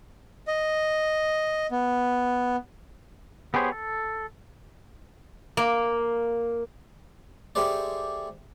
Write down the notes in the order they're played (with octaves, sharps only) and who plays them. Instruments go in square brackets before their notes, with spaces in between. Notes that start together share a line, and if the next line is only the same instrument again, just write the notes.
[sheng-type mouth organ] D#5
B3
[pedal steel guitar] B3 G4 G#4 C5 C#5
A4
[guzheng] A#3
[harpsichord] A3 G4 G#4 C5 D5